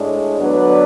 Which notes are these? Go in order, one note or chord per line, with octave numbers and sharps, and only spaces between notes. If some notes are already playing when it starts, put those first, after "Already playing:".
Already playing: A2 G#3 D4
D3 F#3 B3 D4 B4 D5